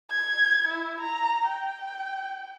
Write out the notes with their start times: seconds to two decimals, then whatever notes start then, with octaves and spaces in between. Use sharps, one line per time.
0.11 G#6
0.68 E4
1.01 A#5
1.47 G5